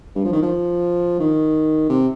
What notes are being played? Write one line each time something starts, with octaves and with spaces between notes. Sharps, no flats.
G2
F3
D#3
F3
D#3
C3